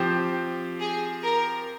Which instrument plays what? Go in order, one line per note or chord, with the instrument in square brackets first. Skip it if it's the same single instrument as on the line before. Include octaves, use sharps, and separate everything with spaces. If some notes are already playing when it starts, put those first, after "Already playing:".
Already playing: [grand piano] F3 C4 G4 C5
[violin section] G#4
A#4